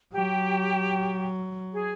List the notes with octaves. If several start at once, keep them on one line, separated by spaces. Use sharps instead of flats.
F#3 G4
G#4